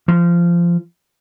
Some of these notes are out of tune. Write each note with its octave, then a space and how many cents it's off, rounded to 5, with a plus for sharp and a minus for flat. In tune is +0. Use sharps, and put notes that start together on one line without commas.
F3 -20